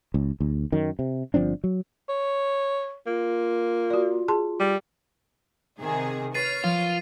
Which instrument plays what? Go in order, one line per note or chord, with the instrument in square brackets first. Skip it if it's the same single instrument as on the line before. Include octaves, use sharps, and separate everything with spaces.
[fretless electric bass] C#2
D2
F#2 D#3
C3
G1 F3 C4 D4
F#3
[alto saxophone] C#5
[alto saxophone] A#3 [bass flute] F4
[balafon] F#4 D5
G#4 A5 C6
[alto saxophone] G3
[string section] C3 D#3 G#4
[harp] B4 [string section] C#5 F6 [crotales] A6 C7 D#7
[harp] F3 [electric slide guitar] F4